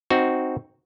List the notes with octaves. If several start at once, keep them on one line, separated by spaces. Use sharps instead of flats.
C4 D#4 F#4